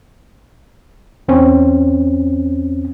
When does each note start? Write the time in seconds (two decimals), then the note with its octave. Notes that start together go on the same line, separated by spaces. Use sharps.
1.28 E2 C4 C#4